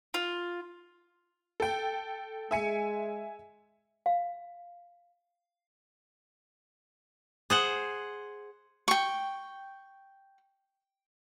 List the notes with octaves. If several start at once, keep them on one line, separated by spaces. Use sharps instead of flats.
F4
A4 G5
G#3 G#4 E5 G#5 C#7
F5
G#4 C5 F#5
G5 C#6